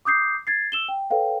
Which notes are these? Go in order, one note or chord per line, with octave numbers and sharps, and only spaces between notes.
D6 D#6 G6 C7
G#6 A6 C7
E6 E7 G7
G5
A4 B4 C#5 F5 G5